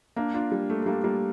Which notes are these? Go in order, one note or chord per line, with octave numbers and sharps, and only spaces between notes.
A#3 D4
D4 F4
G3
A3
A3
G3 A#3
G3 A#3